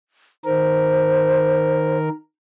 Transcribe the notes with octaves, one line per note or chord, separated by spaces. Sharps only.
D#3 A#4 C5